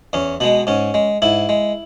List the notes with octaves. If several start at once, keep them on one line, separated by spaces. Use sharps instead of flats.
E2 C#4
B2 G#3 B3
G#2 C#4
G#3
G#2 E4
G#3